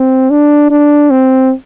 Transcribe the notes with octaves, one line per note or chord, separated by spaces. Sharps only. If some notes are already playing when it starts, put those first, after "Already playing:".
Already playing: C4
D4
D4
C4